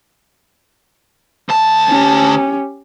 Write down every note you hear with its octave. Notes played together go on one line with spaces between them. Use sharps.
D2 A5
C#4 G4